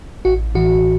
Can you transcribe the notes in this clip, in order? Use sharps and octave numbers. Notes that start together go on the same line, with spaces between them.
A1 F#4
A2 E3 F#4